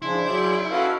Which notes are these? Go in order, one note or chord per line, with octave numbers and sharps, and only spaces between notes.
C#3 F3 G#3 D4 E4 C6
F#3 G#4 D5 G6
C#4 F#4 A4 B4 D#5 F5